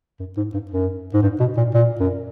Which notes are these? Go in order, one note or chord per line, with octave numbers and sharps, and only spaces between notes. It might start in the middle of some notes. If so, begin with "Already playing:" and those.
F#2
G#2
G2
F#2
G#2
G2
B2
A#2
A#2
F#2